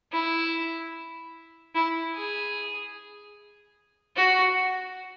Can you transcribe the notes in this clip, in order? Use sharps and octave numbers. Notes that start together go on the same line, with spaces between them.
E4
E4
G#4
F#4